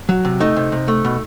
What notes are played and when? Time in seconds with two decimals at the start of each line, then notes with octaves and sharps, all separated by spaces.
0.09 F#3
0.25 C3
0.40 A3 D#4 D#5
0.56 C3
0.72 C3
0.88 A3
1.05 B2